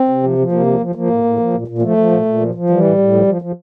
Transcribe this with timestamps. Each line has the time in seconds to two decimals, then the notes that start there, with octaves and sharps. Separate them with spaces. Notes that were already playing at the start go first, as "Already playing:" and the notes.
Already playing: C4
0.09 C3
0.23 F3
0.38 F3
0.51 C3 A#3
0.66 F3
0.81 F3
0.95 F3 A#3
1.10 A2
1.24 A2
1.39 F3
1.53 A#2
1.68 A#2
1.78 A#3
1.82 F3 A3
1.97 F3
2.11 A#2
2.26 A#2
2.40 F3
2.55 F3
2.70 E3 G3
2.84 A2
2.98 A2
3.13 F3
3.27 F3
3.42 F3